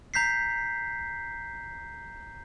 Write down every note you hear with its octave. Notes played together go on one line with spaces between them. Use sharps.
A#5 G6 B6 C7